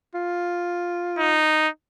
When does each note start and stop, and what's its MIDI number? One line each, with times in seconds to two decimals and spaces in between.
0.14 1.42 65
1.18 1.68 63